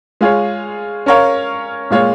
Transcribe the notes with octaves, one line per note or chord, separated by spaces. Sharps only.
G#3 F4 G#4 C#5
C#4 A#4 C#5 F5
A#2 G#3 F4 C#5